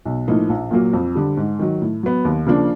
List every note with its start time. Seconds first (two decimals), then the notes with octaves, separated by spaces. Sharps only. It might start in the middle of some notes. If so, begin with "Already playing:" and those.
0.05 B1
0.28 A2 F3 A#3 D#4
0.49 A#1
0.71 A#2 F#3 A#3
0.93 F2
1.15 D3 G3
1.37 G#2
1.59 D#3 F#3
1.82 A2
2.03 F#3 B3
2.25 D#2
2.46 C#3 F3 A#3 D4